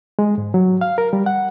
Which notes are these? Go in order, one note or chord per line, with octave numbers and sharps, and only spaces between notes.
G#3
G#2
F#3
F5
A#4
G3
F#5